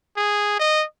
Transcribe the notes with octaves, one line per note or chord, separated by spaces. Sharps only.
G#4
D#5